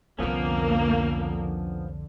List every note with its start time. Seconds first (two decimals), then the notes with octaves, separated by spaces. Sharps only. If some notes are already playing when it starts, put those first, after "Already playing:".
0.19 C2 F2 D3 F3 A#3 B3 C#4